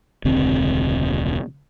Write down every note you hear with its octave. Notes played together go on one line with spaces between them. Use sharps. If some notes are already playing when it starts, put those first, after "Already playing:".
E1 C#2 D3 C4